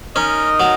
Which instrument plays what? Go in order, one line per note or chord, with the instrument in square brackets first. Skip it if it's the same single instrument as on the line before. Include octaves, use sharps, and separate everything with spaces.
[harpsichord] C#4 [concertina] D#4 A#4 D#5
[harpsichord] F#3